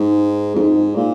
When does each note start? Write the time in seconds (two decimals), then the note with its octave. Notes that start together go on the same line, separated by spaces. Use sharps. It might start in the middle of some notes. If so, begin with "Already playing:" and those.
Already playing: G#2
0.55 F2
0.61 G#2
0.96 A#2